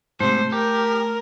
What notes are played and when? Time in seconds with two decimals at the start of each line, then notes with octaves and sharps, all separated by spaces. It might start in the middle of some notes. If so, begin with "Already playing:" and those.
0.20 G#2 C3 A3 C5
0.52 G4 A#4